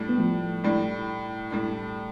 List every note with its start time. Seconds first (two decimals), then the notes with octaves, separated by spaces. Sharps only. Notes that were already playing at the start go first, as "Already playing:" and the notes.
Already playing: A2 G3 D4
0.09 B3
0.18 F3 A3
0.64 A2 G3 D4
1.51 A2 G3 D4